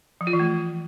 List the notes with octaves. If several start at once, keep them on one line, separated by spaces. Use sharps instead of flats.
F3
F4
E3
A3